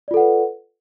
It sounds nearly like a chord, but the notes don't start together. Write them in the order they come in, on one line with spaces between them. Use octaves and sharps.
D5 F4 A4 F#5 B4